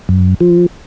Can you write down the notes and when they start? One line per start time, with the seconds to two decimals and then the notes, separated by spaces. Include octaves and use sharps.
0.09 F#2
0.40 F3